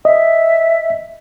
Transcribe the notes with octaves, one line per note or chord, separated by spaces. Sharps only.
D#5 E5